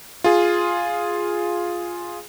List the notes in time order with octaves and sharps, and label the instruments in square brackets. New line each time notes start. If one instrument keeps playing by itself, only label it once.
[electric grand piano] F4 G#4